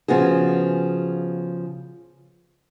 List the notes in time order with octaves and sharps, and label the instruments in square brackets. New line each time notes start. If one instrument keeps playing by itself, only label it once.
[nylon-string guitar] C#3 F3 B3 F#4 G#4